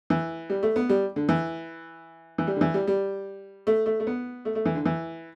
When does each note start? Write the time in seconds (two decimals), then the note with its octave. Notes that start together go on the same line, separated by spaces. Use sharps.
0.10 E3
0.50 G3
0.63 A3
0.76 B3
0.89 G3
1.16 D3
1.29 E3
2.38 E3
2.47 G3
2.56 D3
2.61 E3
2.74 G3
2.87 G3
3.67 A3
3.86 A3
4.00 A3
4.07 B3
4.45 A3
4.55 A3
4.65 E3
4.75 D3
4.85 E3